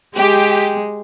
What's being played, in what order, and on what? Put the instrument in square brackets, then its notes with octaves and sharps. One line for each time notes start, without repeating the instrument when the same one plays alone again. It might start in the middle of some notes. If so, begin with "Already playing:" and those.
[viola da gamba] G#3 [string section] G4